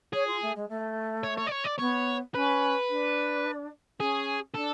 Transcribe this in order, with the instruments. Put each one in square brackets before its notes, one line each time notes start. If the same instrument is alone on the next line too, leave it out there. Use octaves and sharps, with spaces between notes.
[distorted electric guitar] G#4 [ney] C#5
[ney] F4
A3
G#3
A3
[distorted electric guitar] C#5
C#5
D5
C#5
D5
[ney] B3 [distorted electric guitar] C#5
[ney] C#4 [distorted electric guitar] B4
[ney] D4
[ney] C#4 [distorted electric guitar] G#4
[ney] D4 [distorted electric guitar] A4